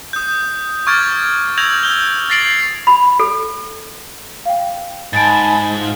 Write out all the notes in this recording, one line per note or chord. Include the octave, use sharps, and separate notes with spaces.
D#6 G6
C#6 D6 F6 G#6 A6 D7
E6 G6 G#6 A#6 F7 F#7
E6 G6 G7
G6 A6 A#6 C7 D7 F#7
B5
A4
F5 G5
G#2 G#5 A5 B5 A6 D7
F4